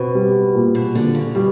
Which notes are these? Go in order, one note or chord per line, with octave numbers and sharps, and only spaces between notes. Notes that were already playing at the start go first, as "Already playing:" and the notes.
Already playing: B2 C4
G3
A#2
B2
A#2 D3
C#3
B2 G3